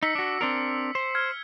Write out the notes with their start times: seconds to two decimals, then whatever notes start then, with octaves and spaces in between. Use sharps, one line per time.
0.03 D#4 E6 B6 C#7
0.15 D4 F#4
0.41 C4 D4 A#4
0.95 C5
1.15 F6 G#6